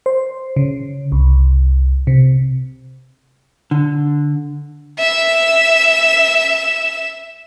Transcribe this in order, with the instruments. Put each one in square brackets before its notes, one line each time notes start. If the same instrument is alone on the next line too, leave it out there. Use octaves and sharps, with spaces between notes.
[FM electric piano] C5
C#3
C2
C3
[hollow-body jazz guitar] D3
[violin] E5 E7